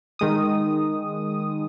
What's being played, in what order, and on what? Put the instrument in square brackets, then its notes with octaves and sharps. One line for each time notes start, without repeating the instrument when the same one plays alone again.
[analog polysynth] D#3 G#3 D#6